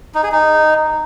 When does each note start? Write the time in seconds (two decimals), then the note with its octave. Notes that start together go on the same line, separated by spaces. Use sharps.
0.15 D#4
0.23 G#4
0.32 D#4